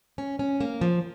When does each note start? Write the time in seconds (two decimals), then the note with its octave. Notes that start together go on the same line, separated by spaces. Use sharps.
0.18 C#4
0.39 C#4
0.60 A#3
0.81 F3